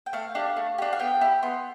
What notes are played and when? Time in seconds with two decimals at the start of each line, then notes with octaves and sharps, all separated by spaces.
0.06 G5
0.13 A3 F5
0.35 D4 G4
0.57 A3
0.78 D4 G4
0.93 F5
1.00 B3 G5
1.21 E4 G4
1.43 B3 C6